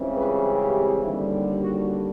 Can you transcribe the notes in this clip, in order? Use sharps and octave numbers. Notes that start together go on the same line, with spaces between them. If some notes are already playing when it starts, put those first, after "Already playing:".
Already playing: C#2 C#3 E3 G3 C4
B4
G4
D#2 D3 G3
F#4